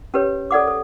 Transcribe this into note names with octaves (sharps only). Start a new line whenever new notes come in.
C#4 G4 B4 C#5
A4 D5 F#5 D6
A4